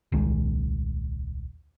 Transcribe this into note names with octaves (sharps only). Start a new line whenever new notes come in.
D#1 C2 D#3 G#3